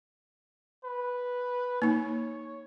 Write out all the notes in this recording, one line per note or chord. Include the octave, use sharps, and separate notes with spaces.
B4
A#3 D#4 C#5